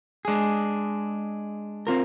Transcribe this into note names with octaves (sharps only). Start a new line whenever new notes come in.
G#3 D4 G#4
C4 F4 A#4